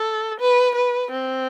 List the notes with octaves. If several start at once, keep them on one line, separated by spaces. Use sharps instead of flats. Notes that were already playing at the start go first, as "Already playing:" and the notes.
Already playing: A4
B4
B4
C4